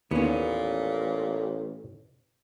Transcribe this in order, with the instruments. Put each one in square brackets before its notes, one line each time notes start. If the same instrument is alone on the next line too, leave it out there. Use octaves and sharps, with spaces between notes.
[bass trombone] A1 [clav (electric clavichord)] D#2 [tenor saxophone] A#2 [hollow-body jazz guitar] B3 C#4